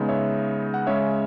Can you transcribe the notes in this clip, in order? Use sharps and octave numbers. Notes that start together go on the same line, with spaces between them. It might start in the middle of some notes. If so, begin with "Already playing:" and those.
Already playing: C#3 G#3 B3 D#4
C#5 E5
F#5
C#3 G#3 C#4 C#5 E5